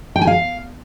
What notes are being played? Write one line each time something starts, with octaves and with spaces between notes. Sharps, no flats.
G5
G#5
F5